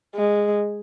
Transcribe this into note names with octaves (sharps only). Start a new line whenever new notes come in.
G#3